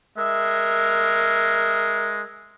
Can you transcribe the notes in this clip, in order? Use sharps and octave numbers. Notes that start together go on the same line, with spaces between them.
G#3 A#4 E5